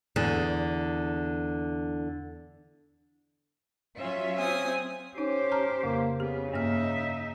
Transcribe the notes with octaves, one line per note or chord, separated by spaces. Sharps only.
E2 D3
F#3 C#4 F4 E5
C4 G#5 D#6
C#4 D#4 G4 C5
A5 A#5 F6
F2 C#3 A#3
C#3 B3 G4
G2 A#3 D#4 E5 F6